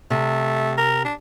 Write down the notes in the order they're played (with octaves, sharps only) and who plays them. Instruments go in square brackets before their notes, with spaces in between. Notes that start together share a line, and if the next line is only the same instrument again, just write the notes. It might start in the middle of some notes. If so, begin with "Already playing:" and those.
[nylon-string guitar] C3 [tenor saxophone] A3
[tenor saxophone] A#4
D4